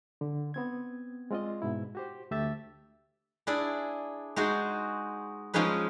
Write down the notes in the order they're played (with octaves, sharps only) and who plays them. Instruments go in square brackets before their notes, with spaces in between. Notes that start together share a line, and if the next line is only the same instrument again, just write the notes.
[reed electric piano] D3
B3 C4 G#6
G#3 C4 F4 D5 D#5
G#2 B2 E4
F#4 G4 C5
D2 A3 G4 E5 E6 A6
[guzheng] D4 E4 G#4 D5
G#3 D#4 F#4 G#4 C5
F3 G#3 C#4 D#4 G#4 B4